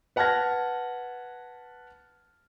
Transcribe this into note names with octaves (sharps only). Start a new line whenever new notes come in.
B4 F#5 A5 F6 G#6 A#6